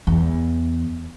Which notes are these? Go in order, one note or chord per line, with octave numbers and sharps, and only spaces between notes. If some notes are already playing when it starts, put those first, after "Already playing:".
E2